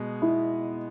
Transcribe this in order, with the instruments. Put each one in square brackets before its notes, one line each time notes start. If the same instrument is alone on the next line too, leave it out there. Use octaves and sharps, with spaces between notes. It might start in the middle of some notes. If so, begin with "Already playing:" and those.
Already playing: [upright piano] B2 G#3
[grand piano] E4